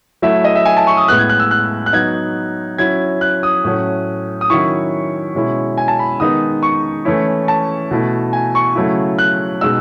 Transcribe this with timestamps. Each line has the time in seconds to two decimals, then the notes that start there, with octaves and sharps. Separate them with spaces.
0.22 F#3 A3 E4 E5
0.44 D#5
0.56 E5
0.65 G#5
0.77 A5
0.87 C#6
0.97 D#6
1.08 A2 G#3 B3 F#6
1.19 G#6
1.29 F#6
1.40 E6
1.51 F#6
1.86 F#6
1.93 F#3 B3 D#4 G#6
2.78 F#3 C#4 E4 G#6
3.21 F#6
3.43 D#6
3.64 A2 F#3 A3 C#4
4.41 D#6
4.50 D#3 F#3 C#4 E4 C#6
5.35 B2 G#3 C#4 E4
5.78 G#5
5.88 A5
5.99 B5
6.20 D#3 G#3 B3 D#4 D#6
6.63 C#6
7.05 E3 A3 C#4 E4
7.48 A5
7.91 B2 A3 E4
8.33 G#5
8.55 C#6
8.75 C#3 F#3 A3 E4
9.19 F#6
9.61 B2 G#3 D#4 E6